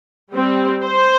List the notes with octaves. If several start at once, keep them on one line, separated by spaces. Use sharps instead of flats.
G3 C4
C5